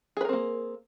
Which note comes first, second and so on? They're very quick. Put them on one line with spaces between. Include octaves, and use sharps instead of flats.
G#4 B4 A#4 C4 A#3